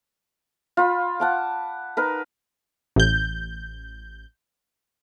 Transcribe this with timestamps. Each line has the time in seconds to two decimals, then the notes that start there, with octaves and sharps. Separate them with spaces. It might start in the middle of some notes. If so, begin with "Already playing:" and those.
0.77 F4 B5
1.20 F#5 A5 D6
1.97 D#4 A#4 B4
2.96 A1 G6